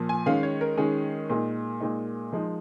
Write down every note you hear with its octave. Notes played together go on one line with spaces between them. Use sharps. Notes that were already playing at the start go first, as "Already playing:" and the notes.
Already playing: A#2 F3
G#5
D#3 G#3 C#4 F5
C#5
A#4
D#3 G#3 C#4 G#4
A#2 G#3 D#4 A#4
A#2 G#3 D#4
F3 G#3 D#4